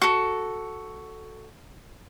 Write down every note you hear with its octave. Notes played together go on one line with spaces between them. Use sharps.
F#4 A4